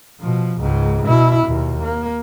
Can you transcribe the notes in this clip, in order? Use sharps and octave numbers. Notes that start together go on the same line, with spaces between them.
B2 F3
C#2 G#2
B2 E4
D#2 B2
A#3